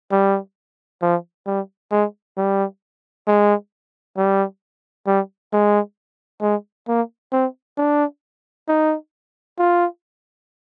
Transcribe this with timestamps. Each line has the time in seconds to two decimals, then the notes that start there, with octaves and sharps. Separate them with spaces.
0.12 G3
1.02 F3
1.47 G3
1.91 G#3
2.37 G3
3.27 G#3
4.17 G3
5.07 G3
5.53 G#3
6.42 G#3
6.88 A#3
7.32 C4
7.77 D4
8.68 D#4
9.58 F4